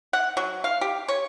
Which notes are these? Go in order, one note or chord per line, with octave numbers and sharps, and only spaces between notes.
F#5
F#3
F5
G4
C#5